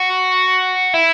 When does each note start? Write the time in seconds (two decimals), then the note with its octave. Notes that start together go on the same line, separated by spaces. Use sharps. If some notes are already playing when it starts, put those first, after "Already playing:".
Already playing: F#4
0.94 E4